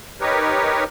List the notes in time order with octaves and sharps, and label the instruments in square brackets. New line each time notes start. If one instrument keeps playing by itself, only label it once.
[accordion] D#4 G4 A#4 B4 C#5